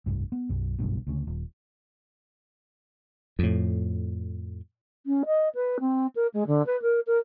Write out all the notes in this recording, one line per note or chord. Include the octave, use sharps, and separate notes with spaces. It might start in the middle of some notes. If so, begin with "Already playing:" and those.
F1 C2 G2
B3
B1 F#2
F#1 B1 G2 B2
D2 C#3
D#1
F2 A2
C#4
D#5
B4
C4
A#4
G#3
D3
B4
A#4
A#4